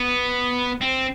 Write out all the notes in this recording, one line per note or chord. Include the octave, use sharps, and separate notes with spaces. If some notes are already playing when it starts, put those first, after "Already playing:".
Already playing: B3
C4